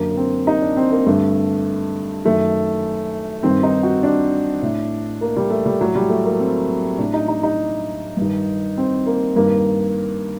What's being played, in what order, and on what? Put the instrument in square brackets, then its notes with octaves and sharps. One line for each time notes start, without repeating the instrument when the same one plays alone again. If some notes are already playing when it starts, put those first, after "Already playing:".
Already playing: [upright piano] F#2 D3 A#3
A#3
C4
D#4
D4
C4
A#3
G2 D3 A3
F#2 D#3 A3
G2 D#3 C4
D#4
F#4
D4
A2
A#3
G3
A3
G3
A2 F#3
G3
A3
A#3
C4
A2 D4
D#4
D#4
D#4
G2 D#3
C4
A#3
G2 D#3 A#3